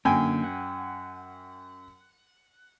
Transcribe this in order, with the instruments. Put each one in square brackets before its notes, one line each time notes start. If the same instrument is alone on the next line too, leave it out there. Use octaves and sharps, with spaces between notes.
[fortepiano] F#2 G5 G#5 [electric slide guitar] D3 A#3
[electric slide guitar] F#5